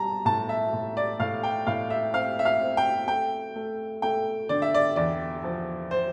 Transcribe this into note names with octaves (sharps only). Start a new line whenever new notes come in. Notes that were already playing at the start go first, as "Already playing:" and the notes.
Already playing: G3 A5 A#5
A2 A5
E5
A2
D5
A2 F5
G5
A2 F5
E5
C4 F5
E5
F5
C4
G5
A3 G5
A3
A3 G5
D3 D5
E5
D5
E2 D5
F3
C5